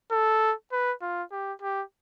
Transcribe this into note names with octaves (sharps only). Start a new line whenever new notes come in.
A4
B4
F4
G4
G4